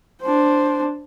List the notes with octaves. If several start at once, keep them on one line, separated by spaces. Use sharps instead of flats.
D4 C5